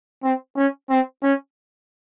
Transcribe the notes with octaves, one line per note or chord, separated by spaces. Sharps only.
C4
C#4
C4
C#4